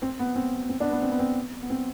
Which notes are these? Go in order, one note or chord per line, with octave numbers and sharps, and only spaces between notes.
C4
B3
C4
C4
B3 D4
B3
C4
B3
C4
B3
C4